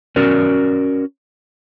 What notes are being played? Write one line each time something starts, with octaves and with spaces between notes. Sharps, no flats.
C#4 F#4 A#4 D5